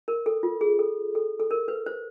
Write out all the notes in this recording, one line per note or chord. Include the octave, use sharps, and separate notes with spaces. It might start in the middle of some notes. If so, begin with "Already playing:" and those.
A#4
A4
F4
G#4
A4
A4
A4
A#4
B4
C5